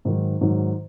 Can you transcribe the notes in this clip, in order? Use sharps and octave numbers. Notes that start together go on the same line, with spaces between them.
G#2 D#3 F#3
G#2 D#3 F#3